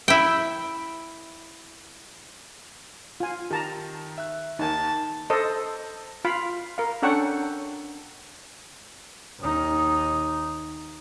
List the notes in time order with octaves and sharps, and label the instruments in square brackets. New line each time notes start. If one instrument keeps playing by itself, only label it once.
[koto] E4 G5
[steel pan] F4 G#5
[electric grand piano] D#3 [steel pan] G4 A5 A#5
[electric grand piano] E5 F#6
[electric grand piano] D#2 D#3 [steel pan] D#4 G#5 [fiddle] A5
[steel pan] A4 C5 D#5
F4 F5 B5
A#4 F5
C#4 D4 A4 F#5 G5 C#6
[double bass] D#2 D#4